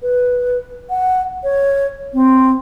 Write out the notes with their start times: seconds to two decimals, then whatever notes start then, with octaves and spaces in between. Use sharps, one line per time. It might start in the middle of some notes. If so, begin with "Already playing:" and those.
0.02 B4
0.90 F#5
1.43 C#5
2.14 C4